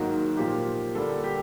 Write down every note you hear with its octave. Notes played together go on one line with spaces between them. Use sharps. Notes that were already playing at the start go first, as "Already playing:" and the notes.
Already playing: G#2 D#3 F#3 A#3 F#4
A#2 F3 A#3 G4
D3 G3 A#3 D4 A4
G4